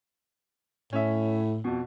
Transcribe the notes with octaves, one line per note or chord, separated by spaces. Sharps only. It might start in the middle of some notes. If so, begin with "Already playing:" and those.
A2 C#4 E5
F2 B2